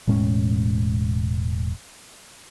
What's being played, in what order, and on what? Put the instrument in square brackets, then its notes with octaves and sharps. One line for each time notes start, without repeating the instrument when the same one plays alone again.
[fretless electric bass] E1 A2 G#3 C#4